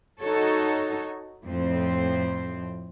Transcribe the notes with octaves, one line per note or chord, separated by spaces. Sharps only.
D#4 F#4 A4 C#5
F2 A2 F3 C4 C5